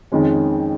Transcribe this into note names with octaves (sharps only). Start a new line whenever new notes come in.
F2 D#3 G#3 C#4